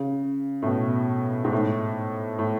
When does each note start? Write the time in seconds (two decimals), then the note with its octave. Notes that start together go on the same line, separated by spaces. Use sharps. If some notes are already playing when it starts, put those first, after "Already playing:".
Already playing: C#3
0.62 A2
0.66 B2
1.44 G#2
1.53 A2
2.39 A2